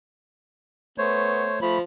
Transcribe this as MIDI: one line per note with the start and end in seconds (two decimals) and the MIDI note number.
0.98 1.59 57
0.98 1.45 59
0.98 1.59 72
0.98 1.59 73
1.62 1.82 53
1.62 1.78 57
1.62 1.78 83